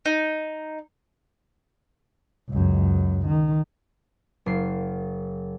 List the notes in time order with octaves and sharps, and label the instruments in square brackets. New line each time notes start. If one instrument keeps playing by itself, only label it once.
[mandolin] D#4
[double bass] C#2 F#2
D#3
[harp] F#1 C7